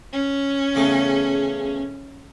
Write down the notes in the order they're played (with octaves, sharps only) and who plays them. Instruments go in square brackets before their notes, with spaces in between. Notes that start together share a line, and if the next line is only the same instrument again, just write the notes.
[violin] C#4
[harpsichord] E2 C#3 A3